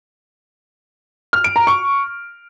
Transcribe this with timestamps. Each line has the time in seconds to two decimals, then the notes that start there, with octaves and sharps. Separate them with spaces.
1.33 F6
1.44 D7
1.56 A#5
1.67 C#6